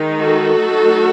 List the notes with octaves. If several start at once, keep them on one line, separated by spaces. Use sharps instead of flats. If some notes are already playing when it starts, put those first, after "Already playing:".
Already playing: D#3 G#3 D#4
F#4 A4
F#3 A3 D#4